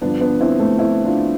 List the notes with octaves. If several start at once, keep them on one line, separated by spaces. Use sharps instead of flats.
G2 D3 F3 B3 D4
B3 D4
C4 E4
A3 C4
C4 E4
D4 F4